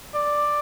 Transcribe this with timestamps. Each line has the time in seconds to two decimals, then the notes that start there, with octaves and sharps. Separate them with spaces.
0.14 D5